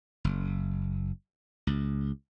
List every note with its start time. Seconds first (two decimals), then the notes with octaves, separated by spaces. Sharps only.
0.24 F#1
1.67 C#2